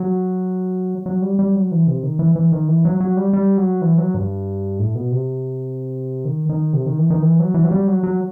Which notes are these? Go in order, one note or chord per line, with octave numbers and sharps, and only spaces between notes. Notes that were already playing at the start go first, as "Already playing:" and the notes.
Already playing: F#3
F#3
G3
G3
F#3
E3
C3
D#3
E3
E3
D#3
E3
F#3
F#3
G3
G3
F#3
E3
F#3
G2
A2
B2
C3
D#3
D#3
C3
D#3
E3
D#3
E3
F#3
E3
F#3
G3
F#3
F#3